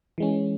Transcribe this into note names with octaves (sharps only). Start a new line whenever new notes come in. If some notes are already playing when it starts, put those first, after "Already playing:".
E3 G#3 C#4